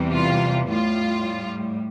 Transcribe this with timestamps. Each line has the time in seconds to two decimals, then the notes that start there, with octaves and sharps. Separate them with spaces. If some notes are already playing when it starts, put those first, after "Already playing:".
Already playing: E2 C3 E3 G3
0.13 F4
0.68 A2 G3 F4